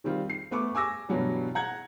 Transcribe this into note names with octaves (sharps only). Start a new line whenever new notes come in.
D#3 G3 C4 F4
C7
A3 B3 C#6 D6
G#5 D6 E6 A#6
G2 B2 E3 F#3 G3
F#5 A#5 G#6